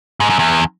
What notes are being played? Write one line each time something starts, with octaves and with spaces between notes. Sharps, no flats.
G#2
F#2
E2